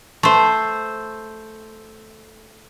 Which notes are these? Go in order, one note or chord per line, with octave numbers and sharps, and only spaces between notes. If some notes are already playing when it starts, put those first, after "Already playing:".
A3 C5